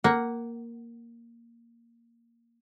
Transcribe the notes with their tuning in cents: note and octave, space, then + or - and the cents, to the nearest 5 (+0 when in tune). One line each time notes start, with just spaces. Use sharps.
A#3 +0 F#5 +10